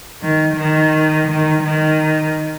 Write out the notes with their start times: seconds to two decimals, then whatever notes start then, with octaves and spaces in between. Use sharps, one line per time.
0.22 D#3
0.57 D#3
1.28 D#3
1.63 D#3